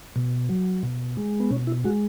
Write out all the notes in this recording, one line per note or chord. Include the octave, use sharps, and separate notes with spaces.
B2
F#3
B2
G#3
B3
B2 C#4
E4
G#3 F#4